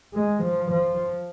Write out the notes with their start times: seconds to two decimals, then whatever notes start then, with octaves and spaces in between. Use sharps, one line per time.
0.14 G#3
0.43 F3
0.71 F3